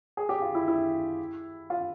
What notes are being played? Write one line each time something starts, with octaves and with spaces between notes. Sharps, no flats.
G#4
G4
F4
E4
E4
F4